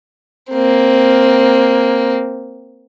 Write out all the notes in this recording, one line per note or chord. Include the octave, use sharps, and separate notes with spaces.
A#3 C4